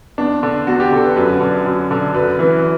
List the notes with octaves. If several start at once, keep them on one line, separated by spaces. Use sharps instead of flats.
E2 D4
D3
E2 F#4
G4
D3 A4
B4
F#2 B4
D3
F#2
D3
F#2 B4
E3